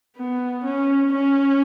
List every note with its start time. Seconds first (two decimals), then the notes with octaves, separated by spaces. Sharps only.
0.17 B3
0.64 C#4
1.12 C#4